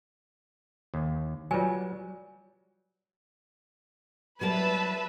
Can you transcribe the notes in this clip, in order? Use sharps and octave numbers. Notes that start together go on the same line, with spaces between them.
D#2
F#3 G3 F4 B4 G#5
F#3 G3 A#4 B4 E5 A5